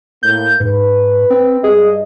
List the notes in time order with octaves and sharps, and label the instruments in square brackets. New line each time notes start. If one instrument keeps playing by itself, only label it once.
[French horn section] A2 A#3 [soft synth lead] G6
[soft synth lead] G#2 [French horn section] B4
[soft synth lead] C4
[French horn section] G2 D#5 [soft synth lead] G#4